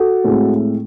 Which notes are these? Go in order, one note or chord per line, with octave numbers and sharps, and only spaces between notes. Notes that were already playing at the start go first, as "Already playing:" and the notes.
Already playing: F#4 A4
A2 G#3 C4